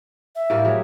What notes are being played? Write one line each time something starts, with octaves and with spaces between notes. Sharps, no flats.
E5
A2 G3 A#3
F#3 C4 G#4